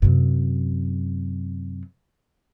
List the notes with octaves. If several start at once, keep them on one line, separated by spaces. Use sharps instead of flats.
F#2 C3